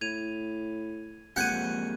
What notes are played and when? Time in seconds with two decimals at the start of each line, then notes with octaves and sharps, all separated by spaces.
0.01 A2 G#6 D#7 F7
1.36 F2 G#3 A#3 G4 F#5 G6 G#6 D#7